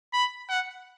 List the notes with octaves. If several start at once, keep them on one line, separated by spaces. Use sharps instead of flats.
B5
F#5